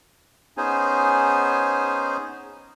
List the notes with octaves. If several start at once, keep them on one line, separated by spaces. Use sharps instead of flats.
B3 C#4 D#4 G#4 C5 G#5